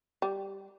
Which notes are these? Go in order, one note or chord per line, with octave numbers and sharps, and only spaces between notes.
G3